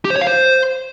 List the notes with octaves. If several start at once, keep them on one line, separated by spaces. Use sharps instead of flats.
G4
C5
C#5
F5
C5